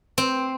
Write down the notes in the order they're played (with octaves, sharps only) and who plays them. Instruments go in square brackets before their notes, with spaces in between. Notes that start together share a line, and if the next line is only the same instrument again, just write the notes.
[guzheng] C4